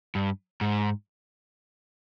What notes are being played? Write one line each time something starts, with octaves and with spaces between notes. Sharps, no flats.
G2
G#2